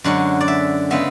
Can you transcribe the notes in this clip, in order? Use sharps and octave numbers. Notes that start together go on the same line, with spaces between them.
F#2 D3 G#3 C#4 F#5
D5
E5
C#3 G#3 B3 E5